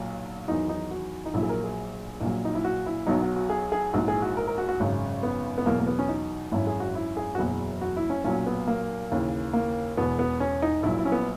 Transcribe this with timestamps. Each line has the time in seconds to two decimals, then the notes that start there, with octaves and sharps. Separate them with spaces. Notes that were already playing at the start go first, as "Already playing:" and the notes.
Already playing: B1 A#2 F#3 F#4
0.48 E2 D#3 F#3 D#4
0.69 D#4
0.91 F#4
1.25 D#4
1.34 A#1 A#2 F#3 E4
1.42 G#4
1.49 A#4
1.64 G#4
2.21 A#1 A#2 F#3
2.45 D#4
2.55 E4
2.64 F#4
2.86 E4
3.07 B1 B2 F#3 D#4
3.22 F#4
3.36 F#4
3.50 G#4
3.72 G#4
3.93 A#1 G#2 E3 F#4
4.08 G#4
4.22 F#4
4.37 A#4
4.47 A#4
4.58 F#4
4.69 F#4
4.80 G#1 F#2 C#3
5.23 B3
5.58 B3
5.66 E2 B2 F#3 A#3
5.80 A#3
5.87 B3
5.99 C#4
6.09 D#4
6.52 G#1 F#2 E3 E4
6.67 G#4
6.80 F#4
6.95 E4
7.17 G#4
7.35 F#4
7.38 F#1 E2 B2 F#3 G#4
7.82 F#4
7.96 E4
8.10 C#4
8.24 B1 A#2 F#3 C#4
8.46 B3
8.67 A#3
9.11 D#2 C#3 E3
9.53 A#3
9.97 E1 E2 B2 B3
10.19 B3
10.40 C#4
10.62 D#4
10.83 A#1 A#2 F#3 E4
10.98 E4
11.05 C#4
11.12 B3